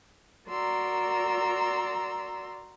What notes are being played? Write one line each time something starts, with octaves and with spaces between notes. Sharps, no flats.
F#4 A#4 D5 A#5 C6 E6